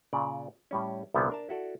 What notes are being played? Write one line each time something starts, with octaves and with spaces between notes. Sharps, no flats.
A#2 C#3 D5
A2 G3 C#4
C2 A#2 D3 G3 B3 E4
D4 A#4 A5
E4 F#4 A4 D5